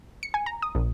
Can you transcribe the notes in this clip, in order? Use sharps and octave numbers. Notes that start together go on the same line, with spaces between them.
C#7
G#5
A#5
D#6
A#1